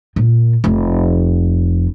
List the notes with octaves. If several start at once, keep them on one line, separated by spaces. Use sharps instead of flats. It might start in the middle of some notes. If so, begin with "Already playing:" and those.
A#2
F1